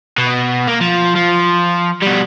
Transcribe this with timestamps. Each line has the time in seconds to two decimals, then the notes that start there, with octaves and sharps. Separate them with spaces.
0.18 B2
0.67 A#3
0.81 F3
1.15 F3
2.02 B2 G3